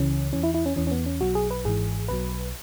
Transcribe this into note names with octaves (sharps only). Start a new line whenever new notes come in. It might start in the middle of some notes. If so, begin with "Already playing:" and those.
Already playing: C#2 C#3 E3 C#4
E2 E3 C#4
E4
E4
C#4
E2 E3 C#4
C#4
B3
C#4
B1 B2 F#3 F#4
G#4
B4
G#1 G#2 E3 G#4
B1 B2 F#3 B4